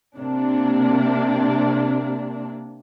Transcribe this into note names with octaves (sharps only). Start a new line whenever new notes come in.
C3 A#3 D4